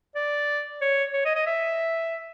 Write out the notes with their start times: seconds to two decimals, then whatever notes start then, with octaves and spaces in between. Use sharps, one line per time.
0.15 D5
0.81 C#5
1.13 C#5
1.25 D#5
1.36 D#5
1.46 E5